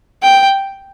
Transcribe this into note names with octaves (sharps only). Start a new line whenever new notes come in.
G5